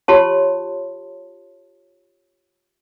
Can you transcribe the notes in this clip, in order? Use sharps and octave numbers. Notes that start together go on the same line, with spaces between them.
F4 G4 C#5 A5 C6